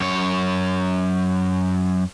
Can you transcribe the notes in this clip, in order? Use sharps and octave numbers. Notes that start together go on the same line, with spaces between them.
F#2 C#5